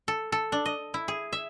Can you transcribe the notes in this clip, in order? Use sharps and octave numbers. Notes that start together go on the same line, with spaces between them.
A4
A4
D4
D#5
E4
G#4
E5